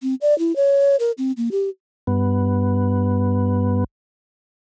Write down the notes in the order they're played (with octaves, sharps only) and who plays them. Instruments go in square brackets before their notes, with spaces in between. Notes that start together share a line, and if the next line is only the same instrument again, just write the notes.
[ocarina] C4
D5
E4
C#5
A#4
C4
A#3
G4
[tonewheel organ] G2 B3